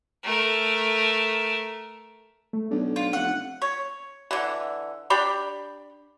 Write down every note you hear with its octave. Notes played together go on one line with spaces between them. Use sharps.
A3 A#4
A3
B1 D4
F4
F1 F#5
C#5
D3 E3
D4 G4 B5